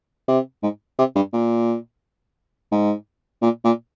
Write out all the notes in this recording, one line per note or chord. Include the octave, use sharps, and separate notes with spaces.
C3
G#2
C3
G2
A#2
G#2
A#2
A#2